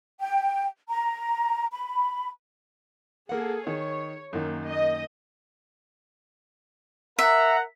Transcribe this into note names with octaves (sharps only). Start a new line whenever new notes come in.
G5
A#5
B5
A#3 G#4 A4 F#5
D#3 C#5
F#2 D#3 A#3
D#5
A#4 E5 F#5 A#5